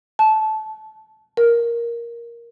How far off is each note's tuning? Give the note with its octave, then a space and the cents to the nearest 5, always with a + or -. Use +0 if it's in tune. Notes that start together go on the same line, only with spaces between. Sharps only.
A5 -20
A#4 +5